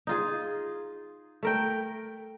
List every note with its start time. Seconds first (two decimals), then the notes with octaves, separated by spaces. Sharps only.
0.07 D#4 F4 G#4
1.43 A3 A#4 G5